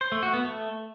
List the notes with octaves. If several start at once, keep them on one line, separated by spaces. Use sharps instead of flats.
C5
A3
F#4
B3
A3